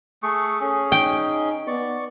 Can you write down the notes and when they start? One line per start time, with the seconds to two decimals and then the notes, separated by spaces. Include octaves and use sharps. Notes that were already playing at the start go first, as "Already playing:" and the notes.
0.23 A3 G#4 C#6
0.61 C#4 G#4 A4
0.92 D#4 G5
1.67 B3 D5 C#6